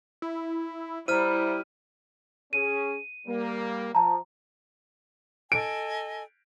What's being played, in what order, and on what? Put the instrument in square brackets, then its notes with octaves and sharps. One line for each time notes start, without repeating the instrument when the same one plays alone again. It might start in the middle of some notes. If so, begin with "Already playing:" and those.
[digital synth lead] E4
[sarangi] G3 [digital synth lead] E4 [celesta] C5 A#5 [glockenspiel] F6 D#7
[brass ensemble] C#4 G#4 [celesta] D#7
[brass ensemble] G3 A#3
[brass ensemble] F3 [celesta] A5 A#5
[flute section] A4 D#5 G#5 [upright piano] D7